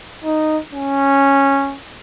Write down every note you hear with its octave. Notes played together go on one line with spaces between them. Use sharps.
D#4
C#4